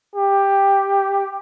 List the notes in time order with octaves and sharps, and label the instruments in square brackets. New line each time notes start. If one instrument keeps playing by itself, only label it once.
[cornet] G4